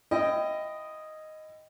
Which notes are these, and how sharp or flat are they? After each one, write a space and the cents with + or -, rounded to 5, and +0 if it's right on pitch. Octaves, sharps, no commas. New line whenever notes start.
E4 +25 D#5 +0 G5 +0